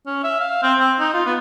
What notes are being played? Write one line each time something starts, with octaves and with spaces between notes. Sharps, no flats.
C#4
E5
F5
C4
C4
D#4
F4
B3